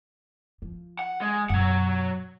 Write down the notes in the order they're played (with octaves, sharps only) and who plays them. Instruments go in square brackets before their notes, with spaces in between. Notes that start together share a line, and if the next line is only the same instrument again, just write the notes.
[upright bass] F3
[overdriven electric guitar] F#5
G#3
[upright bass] F#2 B2 [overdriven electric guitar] F#3 F#5